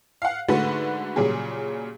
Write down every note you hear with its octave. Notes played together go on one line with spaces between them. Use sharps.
F5 F#5
G#2 D3 A3 F#4 B4
A#2 C#3 F#3 G3 G#4